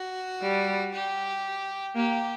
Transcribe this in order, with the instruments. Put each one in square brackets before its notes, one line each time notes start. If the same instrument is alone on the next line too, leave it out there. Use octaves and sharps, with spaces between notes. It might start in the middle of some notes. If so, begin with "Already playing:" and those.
Already playing: [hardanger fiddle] F#4
[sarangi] G3
[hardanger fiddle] G4
[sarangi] A#3 [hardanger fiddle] G4